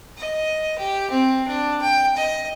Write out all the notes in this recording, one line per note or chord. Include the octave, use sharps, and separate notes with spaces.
D#5
G4
C4
D4
G5
D#5